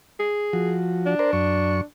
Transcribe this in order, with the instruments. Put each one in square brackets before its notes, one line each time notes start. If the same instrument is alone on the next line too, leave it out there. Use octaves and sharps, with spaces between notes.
[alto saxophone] G#4
[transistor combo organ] F3 F#4
[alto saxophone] D4
[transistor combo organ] A#4 C5 D5
F#2 C#6